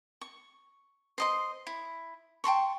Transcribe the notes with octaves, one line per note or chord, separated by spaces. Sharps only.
C#6
C5 D#5 C6
E4
G5 A5 C6 C#6